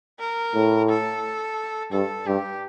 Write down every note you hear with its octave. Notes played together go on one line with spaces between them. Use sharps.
A#4
A2
A4
G2 A4
G2 G4